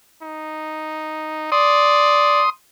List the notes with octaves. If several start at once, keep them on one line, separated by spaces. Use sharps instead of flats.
D#4
D5 C6 D#6